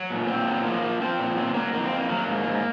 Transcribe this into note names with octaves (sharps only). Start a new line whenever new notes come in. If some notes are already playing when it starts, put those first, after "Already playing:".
Already playing: F#3
A#2
A#2 C4
F#3
F3 A#3
F3
F3 C4
A#2
F#3 C4
F#3 A#3
F2 A#3
C4
F2 A#3
F#3 A#3
G#2
G#2